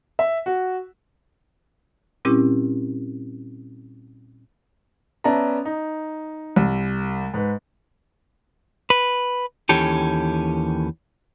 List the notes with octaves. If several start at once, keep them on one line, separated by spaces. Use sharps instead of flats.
E5
F#4
A#2 G3 C4 C#4 E4 G4
B3 C#4 D5 E5 A5 A#5
D#4
C2
G#2 B4
B4
D#2 D#3 E3 C#4 G4 A4